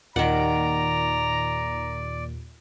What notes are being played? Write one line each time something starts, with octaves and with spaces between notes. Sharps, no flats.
D#2 A#2 D#3 D5 F#5 A#5 D7